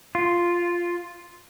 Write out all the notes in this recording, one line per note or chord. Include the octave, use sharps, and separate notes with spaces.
F4